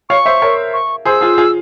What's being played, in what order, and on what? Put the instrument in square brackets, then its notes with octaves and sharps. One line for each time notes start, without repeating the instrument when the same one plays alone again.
[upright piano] C#5 F5 [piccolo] C#6
[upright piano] C5 E5
A#4 C#5
[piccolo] C#6
[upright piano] G#4 C5 [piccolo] E6
[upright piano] F4 G#4
F4 G#4